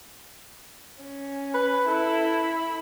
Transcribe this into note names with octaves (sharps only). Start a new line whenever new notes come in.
C#4
B4
E4 A4 B5